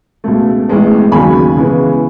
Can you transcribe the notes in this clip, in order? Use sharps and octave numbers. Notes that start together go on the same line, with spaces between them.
C#2 B2 A3
A1 A2 G#3 B3
D#2 C#3 F#3 G#5 B5
C#2 C#3 E3 G#3 B3